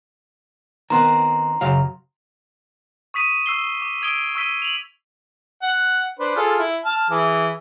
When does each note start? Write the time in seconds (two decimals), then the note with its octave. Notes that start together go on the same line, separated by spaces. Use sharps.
0.90 D#3 B3 C4 A#5 C6
1.61 F#2 C#3 F5
3.14 C#6 D#6 B6 D#7 E7
3.46 C#6 E6 C7 G7
3.82 D6
4.02 D#6 G#6 D7 G7
4.35 C#6 E6 B6 D#7
4.62 F7 F#7
5.62 F#5
6.19 D4 B4 C5
6.36 F4 G#4 A4
6.59 E4
6.85 A5 F6
7.10 E3 G#4